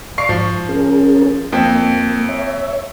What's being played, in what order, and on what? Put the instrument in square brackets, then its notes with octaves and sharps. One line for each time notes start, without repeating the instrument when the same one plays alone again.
[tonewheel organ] D5 F5 D6 [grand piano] C#6 C7
[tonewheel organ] G#2 [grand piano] F3
[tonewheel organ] C#4 G#4 A#4
[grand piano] F2 C4 [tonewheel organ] A#3
[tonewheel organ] C#5 E5